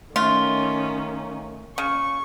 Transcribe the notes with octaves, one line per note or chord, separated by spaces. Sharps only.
D#3 A3 C#4 F4
C#3 C#6